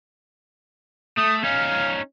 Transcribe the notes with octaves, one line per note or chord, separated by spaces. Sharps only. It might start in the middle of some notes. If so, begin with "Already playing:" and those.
A3 D#6
C#4 D#4 F5